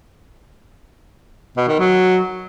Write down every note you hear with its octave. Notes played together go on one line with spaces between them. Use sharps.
B2
D#3
F#3